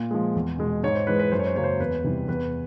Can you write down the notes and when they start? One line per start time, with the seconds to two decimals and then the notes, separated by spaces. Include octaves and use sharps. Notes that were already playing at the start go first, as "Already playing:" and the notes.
Already playing: A#2
0.11 F3 G#3
0.35 E2
0.59 B2 G#3
0.84 G#2 C#5
0.95 C5
1.07 E3 G#3 B4
1.19 B4
1.32 F#2 C5
1.39 C#5
1.47 C5
1.56 C#3 F#3 A#3 C#5
1.64 C5
1.80 E2 B4
2.04 C3 E3 G3
2.28 E2 B4